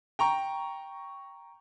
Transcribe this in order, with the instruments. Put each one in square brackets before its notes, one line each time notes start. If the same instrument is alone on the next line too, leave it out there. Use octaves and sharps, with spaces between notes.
[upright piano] G5 A#5 C#6